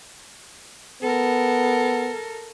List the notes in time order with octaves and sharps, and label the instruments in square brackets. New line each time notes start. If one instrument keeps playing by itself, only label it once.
[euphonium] B3 [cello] A4 A#4